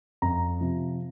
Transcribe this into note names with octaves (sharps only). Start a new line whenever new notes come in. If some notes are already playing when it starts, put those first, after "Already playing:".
F2 A#5
C3 F3